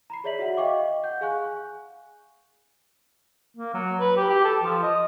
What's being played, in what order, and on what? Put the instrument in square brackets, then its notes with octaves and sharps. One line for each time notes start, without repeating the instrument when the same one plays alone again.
[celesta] A#5 B5 C7
G#4 C#5 D5 E5 B6 F#7
F#4 E5 F#5
D#5 F5 G5 C#6 D6
F#5 G6
G#4 F5 G#5 C#6 F#6
[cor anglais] A#3
F#3
B4
G4
G4
A4
F3
D#5